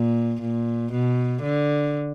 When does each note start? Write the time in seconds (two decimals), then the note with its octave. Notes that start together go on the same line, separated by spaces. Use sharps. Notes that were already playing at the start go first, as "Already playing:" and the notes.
Already playing: A#2
0.41 A#2
0.92 B2
1.42 D3